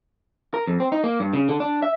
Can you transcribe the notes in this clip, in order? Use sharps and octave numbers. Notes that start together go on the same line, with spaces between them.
A#4
F2
C4
D#4
A#3
G2
C#3
D3
D4
E5